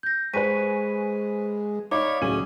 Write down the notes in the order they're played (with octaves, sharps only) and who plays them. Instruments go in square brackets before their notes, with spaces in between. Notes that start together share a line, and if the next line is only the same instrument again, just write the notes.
[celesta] G6 A#6
[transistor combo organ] G#3 [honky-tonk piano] B4 G#5 C#6 [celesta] C5 B6 D#7
[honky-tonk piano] D#4 [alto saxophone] C#5 [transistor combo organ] D5 F5 B5 [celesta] D6
[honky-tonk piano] C#2 G#4 D#7 [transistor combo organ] A2 F#3 [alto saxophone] C#4